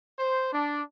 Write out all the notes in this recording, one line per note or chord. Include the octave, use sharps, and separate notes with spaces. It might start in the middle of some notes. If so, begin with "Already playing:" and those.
C5
D4